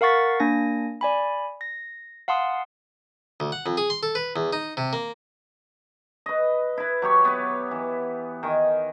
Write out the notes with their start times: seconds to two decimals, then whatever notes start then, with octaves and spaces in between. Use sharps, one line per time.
0.01 A#4 F5 F#5 C#6 A6 B6
0.40 A#3 D4 G#5 A#6
1.01 D5 G#5 B5
1.61 A#6
2.28 F5 F#5 A5 C6 D#6
3.40 D2
3.52 F#5
3.66 F2
3.77 G#4
3.90 C6
4.03 A4
4.15 B4
4.36 E2
4.53 D#4
4.77 C3
4.93 A#3
6.26 B4 D#5
6.77 E4 B4
7.02 F#3 G4 C#5
7.25 B3 B4
7.71 E3
8.43 D#3 G#5